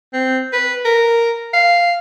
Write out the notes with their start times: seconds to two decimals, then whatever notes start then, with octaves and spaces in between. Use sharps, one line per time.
0.13 C4
0.53 B4
0.85 A#4
1.53 F5